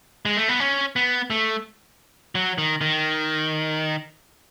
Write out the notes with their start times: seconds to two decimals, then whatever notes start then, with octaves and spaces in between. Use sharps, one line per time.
0.25 G#3
0.37 A3
0.49 B3
0.60 C#4
0.96 B3
1.30 A3
2.35 F#3
2.58 D#3
2.81 D#3